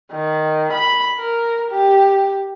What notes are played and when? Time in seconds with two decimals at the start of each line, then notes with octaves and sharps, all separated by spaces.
0.13 D#3
0.73 B5
1.19 A#4
1.71 G4